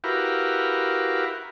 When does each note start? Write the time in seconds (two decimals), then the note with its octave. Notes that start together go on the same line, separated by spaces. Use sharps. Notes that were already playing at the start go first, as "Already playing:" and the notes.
0.04 E4 F#4 G4 A#4 B4 F5